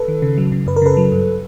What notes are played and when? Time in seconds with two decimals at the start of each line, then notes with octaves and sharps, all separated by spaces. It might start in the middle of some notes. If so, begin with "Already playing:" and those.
Already playing: A4 B4
0.08 D#3
0.22 C#3
0.38 F#3
0.52 C#3
0.67 F#2 B4
0.76 A#4
0.82 C#3 A4 B4
0.97 F#3
1.12 G2